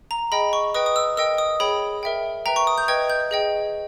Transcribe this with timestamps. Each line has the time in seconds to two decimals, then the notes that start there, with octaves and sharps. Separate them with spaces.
0.11 A#5
0.32 G#4 D#5 G5 B5
0.53 C#6
0.74 B4 D#5 G5 D#6
0.86 D#6
0.96 E6
1.17 A#4 D#5 G5 E6
1.38 D#6
1.60 G#4 C#5 G5 B5
2.03 A#4 E5 G5
2.46 B4 E5 G5 A#5
2.56 C#6
2.67 D#6
2.78 G6
2.88 B4 D#5 G5 G#6
3.10 G6
3.31 G#4 D#5 G5